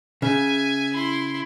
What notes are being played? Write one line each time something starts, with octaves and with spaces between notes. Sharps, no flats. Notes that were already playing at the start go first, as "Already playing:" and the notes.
C#3 E5 G#5
E4 C6